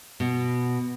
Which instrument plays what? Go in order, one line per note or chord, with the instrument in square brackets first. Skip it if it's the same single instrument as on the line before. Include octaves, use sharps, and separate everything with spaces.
[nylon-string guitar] B2